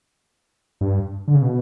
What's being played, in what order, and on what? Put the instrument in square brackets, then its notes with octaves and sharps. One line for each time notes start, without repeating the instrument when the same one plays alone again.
[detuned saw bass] G2
D3
C#3
B2